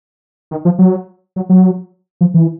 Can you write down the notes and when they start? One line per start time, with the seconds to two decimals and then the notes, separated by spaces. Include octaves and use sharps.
0.51 D#3
0.65 F3
0.79 F#3
1.36 F#3
1.49 F#3
2.21 F3
2.34 E3